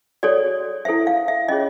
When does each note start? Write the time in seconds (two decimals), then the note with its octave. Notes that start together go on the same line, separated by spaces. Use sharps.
0.23 F#4 A4 C#5 D5
0.85 E4 A4 C5 E5
1.07 F5
1.28 E5
1.48 C#4 F4 G#4 C#5 D#5